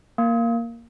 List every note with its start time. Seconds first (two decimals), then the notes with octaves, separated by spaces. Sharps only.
0.18 A#3